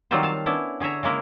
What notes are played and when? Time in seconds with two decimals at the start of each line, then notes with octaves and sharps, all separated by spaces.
0.11 D#3 F#3 G3 C4 F4 C5
0.23 F5 A5
0.46 B3 C#4 D4 E4
0.80 D3 G#4 C#5 E5 A#5
1.03 C#3 G#3 A#3 E4 A#4